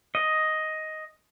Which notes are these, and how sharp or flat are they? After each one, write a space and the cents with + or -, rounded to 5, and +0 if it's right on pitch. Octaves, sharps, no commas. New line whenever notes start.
D#5 +5